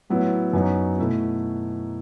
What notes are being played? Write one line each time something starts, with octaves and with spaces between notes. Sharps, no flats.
A2 F#3 B3 E4
F#2 F#3 B3 D#4
B2 A3 E4